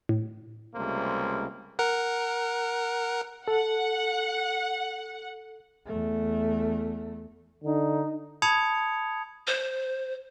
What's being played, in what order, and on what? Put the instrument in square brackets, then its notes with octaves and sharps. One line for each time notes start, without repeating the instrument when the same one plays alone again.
[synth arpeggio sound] A2
[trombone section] C#2 C3 G3 A3 A#3 C5
[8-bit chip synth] A#4 F#5
[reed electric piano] A4 [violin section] F#5
[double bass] E2 A3
[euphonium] D3 [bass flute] D#4
[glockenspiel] A5 B5 D#6 G#6 C#7 F7
[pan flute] C5